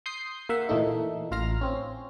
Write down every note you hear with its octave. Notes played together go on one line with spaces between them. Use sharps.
C6 D#6 G6 C7
A#3 E5 F#5
A#2 E3 A3 A#3 D#4
A1 F4 F5 A#5 F6
C4 C#4